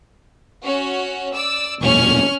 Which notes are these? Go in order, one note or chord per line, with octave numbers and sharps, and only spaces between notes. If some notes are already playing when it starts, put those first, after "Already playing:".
C#4 F#4 C#5
D5 E6
E1 F#2 A#2 C#4 C#6 F6